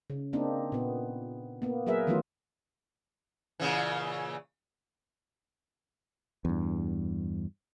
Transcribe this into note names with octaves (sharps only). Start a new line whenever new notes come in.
C#3
A#3 C4 D4 D#4
A#2 B3
A#3 B3
F#3 A#3 G#4 A#4 B4 E5
D#3 E3 F#3 A3 B3 F4
A#2 C#3 E3
E2 G2